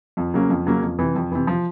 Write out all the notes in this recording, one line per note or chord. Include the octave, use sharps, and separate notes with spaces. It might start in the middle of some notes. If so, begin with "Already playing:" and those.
F2
C#3 F#3 A#3 C#4
F2
C#3 F#3 A#3 C#4
F2
C3 E3
F2
C3 E3
F3